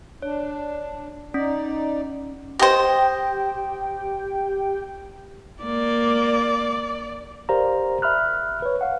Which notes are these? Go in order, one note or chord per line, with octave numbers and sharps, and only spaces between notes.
D4 C#5
C#4 D#4 D5 B6
G4 C5 D#5 G5
A#3 D5
G4 A#4 C5 D5 F5 A#5
E5 B5 F6 F#6
B4 C#5
F5 F#5